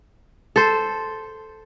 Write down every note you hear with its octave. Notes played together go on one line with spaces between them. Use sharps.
A4 C5